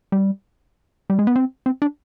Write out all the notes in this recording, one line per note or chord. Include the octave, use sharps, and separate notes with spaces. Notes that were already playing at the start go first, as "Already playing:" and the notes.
G3
G3
G#3
B3
C4
C4
D4